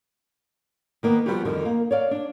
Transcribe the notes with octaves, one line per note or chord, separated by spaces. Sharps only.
D#3 A#3 B3
F3 G3 A3 B3 F#4 G4
F2 D3 D#3
A#3
C#5 D5 F5
D4